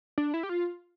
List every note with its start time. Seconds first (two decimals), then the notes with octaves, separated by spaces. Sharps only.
0.18 D4
0.34 E4
0.43 G4
0.49 F4